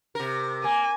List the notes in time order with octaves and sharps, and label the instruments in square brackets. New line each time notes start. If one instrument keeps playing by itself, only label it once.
[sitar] C3 A#4
[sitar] A#3 [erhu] G#5